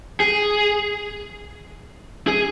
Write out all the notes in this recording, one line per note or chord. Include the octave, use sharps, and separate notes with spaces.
G#4
G#4